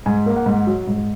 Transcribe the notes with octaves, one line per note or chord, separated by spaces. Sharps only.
G#2 G#5
A#3
F#5
G#2
F#3
G#2